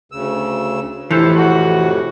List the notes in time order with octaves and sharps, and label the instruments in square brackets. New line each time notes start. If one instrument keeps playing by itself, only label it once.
[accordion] D2 C#3 E6
[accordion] F2 A2 C3 [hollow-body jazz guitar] E3 [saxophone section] A4 C5
[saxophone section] F#4